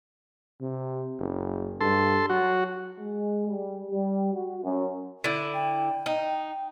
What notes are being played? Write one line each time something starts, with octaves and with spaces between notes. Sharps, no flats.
C3
F#1
G2 A4 C6
F#3 F#4
G#3
G3
G3
F#4
F#2
D3 E4
G5
D#4